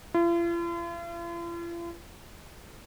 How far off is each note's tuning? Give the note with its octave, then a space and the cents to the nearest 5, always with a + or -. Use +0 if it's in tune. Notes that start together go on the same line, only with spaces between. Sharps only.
F4 -45